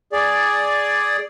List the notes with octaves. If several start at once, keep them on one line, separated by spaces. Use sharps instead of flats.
G#4 D5